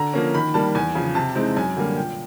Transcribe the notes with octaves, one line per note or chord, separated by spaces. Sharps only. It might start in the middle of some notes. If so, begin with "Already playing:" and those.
Already playing: D3 A#5
F3 A#3 C#4
D#3 B5
G3 A#3 A5
E2 G#5
C#3 F3
C3 A5
E3 G#3 C4 D#4
F#2 G#5
D3 G3 A#3
A#2 G5